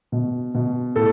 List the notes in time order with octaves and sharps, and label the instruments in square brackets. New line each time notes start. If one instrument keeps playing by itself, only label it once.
[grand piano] B2
B2
A2 A4